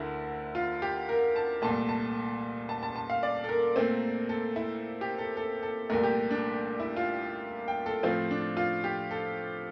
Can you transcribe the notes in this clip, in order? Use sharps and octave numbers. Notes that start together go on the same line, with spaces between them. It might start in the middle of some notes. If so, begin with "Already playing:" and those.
Already playing: D2 D3 A3 E4 A#4
F4
G4
A#4
A5
C2 A#2 A3 A5
A5
A5
A5
A5
F5
D5
A4
A#4
A#2 A3 C4
A4
E4
G4
A4
A4
A4
C2 A#2 A3 A#4
G4
D4
E4
F4
G5
A4
A2 F3 A3 C4 F4
D4
F4
G4
A4